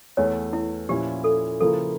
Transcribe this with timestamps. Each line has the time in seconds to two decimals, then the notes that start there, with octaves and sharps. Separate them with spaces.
0.17 E2 E3 A3 C#5
0.53 E4
0.89 A#2 F3 C#4 E4 G4
1.24 A4
1.60 C#3 F3 A#3 E4 A4